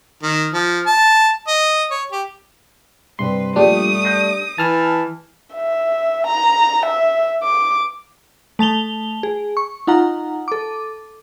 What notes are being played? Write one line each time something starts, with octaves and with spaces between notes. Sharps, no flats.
D#3
F3
A5
D#5
C#5
G4
G2 C3 B4 C6
A#2 F3 G3 A3 D4 G4 D#6
G6 A#6 C7
E3 A5 F6
E5
A#5
E5
D6
A3 A5 F7 G7
G#4
C#6
D#4 F4 F#5 A#5
A4 D6